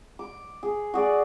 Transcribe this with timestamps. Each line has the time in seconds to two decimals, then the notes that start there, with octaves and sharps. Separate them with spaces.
0.19 D6
0.63 G#4
0.94 F#4 G#4 D5